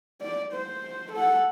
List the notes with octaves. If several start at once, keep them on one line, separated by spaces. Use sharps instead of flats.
D5
C5
A4 F#5